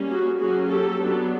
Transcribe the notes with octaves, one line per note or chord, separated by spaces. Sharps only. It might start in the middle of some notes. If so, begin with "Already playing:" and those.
Already playing: G3 A#3 C#4
F#4 G#4
F#3 A#3 C#4 F#4 G#4
G4 A4
F#3 B3 D4